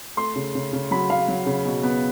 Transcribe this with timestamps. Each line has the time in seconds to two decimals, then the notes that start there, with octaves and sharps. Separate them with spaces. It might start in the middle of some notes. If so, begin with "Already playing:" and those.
0.17 A3 C6
0.36 C#3
0.55 C#3
0.73 C#3
0.91 F#3 B5
1.10 F#3 F5
1.28 F#3
1.46 C#3
1.65 B2
1.83 B3